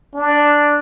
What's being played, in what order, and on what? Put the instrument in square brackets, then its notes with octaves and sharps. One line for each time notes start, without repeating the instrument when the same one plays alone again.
[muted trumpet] D4